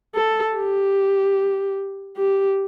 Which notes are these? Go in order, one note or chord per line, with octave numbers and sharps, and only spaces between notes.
A4
G4
G4